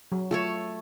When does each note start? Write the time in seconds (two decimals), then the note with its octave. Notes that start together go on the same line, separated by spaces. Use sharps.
0.12 F#3
0.31 A3 F4 A4 C#5